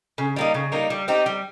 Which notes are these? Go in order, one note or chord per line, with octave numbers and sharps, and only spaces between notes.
C#3
G3 A#3 D#4
C#3
G3 A#3 D#4
G3
C4 D#4 G4
G3